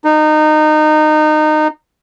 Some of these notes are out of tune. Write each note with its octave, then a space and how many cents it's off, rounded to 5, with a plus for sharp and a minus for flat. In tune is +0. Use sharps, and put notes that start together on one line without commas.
D#4 -25